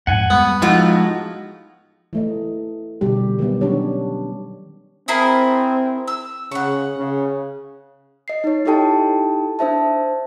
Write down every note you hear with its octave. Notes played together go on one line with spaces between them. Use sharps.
F2 G#2 F#5 G#5
G3 G#3 B3
A2 F3 G#3 D#4 F4 F#4
E3 A3 D#5
B2 D3 G3 G4
D#3 F#3 G3 B3
C#4 D4 G4 C#5
C4 E4 G#4 A#4
E6
C#3 F#5 C#6
C#3
D#5 C7
D#4 C#5
D#4 E4 G4 A4 G5 A5
D4 C5 E5 A5